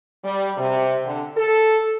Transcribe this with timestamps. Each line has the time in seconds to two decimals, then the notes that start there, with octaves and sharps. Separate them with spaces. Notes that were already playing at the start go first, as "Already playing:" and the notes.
0.24 G3
0.57 C3
1.05 D3
1.36 A4